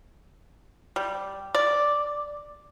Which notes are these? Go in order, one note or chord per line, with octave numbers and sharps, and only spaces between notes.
G3
D5